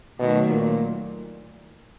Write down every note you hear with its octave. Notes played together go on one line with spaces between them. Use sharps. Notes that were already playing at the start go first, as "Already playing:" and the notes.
B2 D#3 F#3 A3
A#2